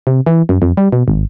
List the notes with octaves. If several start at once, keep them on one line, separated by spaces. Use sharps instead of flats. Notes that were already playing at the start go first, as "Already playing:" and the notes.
C3
E3
F#2
F2
G3
B2
G#1